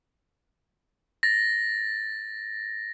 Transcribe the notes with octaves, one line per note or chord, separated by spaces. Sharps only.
A6 A#6